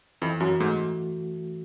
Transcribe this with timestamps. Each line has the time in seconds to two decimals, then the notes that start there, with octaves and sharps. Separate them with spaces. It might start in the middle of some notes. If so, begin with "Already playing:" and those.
0.22 F2 E3
0.40 F#2 F#4
0.60 G#2 A3